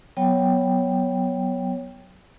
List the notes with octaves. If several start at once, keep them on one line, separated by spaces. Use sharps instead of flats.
F#3 B3 C#5 G5